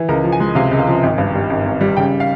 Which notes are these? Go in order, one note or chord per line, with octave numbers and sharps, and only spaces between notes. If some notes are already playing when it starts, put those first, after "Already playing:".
Already playing: E3
C#2 A#4
F3
G#5
G#3
C3 F5
C#2
F5
F3
G#1
G2
G3
G#1
G#1
G3
C#3 G5
F5